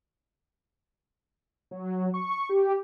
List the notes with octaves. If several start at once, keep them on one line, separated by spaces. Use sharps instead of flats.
F#3
C#6
G4